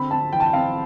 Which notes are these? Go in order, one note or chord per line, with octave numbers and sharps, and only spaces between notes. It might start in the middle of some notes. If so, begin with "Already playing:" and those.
Already playing: D3 C4 B5
C4 A5
E3 G5
A5
G5
C4 F5